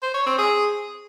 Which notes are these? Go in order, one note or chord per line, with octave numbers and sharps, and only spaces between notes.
C5
C#5
C4
G#4